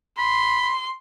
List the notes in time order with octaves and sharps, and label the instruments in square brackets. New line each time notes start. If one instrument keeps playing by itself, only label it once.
[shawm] B5 [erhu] C6